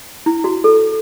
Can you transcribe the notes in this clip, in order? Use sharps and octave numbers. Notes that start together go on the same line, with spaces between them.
E4
F#4
A4